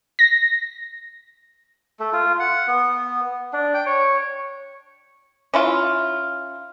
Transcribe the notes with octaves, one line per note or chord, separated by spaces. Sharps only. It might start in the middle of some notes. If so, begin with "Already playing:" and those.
A#6
A3
F4
F#5
B3
D4
G5
C#5
C#4 E4 F4